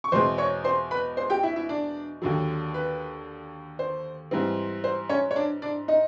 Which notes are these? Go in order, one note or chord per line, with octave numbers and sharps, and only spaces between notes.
C#6
E2 B2 G#3 C4 C5 C6
C#5 C#6
C5 C6
B4 B5
C5 C6
G4 G5
E4 E5
E4 E5
D4 D5
D#2 D3 F#3
B4
C5
G#2 E3 G3 C4
C5
C#4 C#5
C#5
D4 D5
D4 D5
D#4 D#5